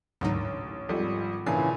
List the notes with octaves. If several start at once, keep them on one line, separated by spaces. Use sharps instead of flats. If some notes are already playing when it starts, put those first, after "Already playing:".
A1 D2 G#2 C3 F#3 D#4 A#4
G#1 F3 G3 G#3 A4
A#2 C#3 E3 A#3 D4 G#4 A4 C7